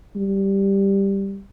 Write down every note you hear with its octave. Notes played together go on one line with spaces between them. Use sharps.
G3